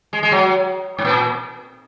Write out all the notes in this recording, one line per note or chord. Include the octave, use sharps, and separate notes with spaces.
G#3
G#3
F#3
G#2
A#2